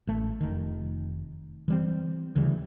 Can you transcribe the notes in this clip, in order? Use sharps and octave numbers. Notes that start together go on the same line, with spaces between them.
A1 A3
F1 D#3
E3 G3 C4
D2 C#3 E3 G3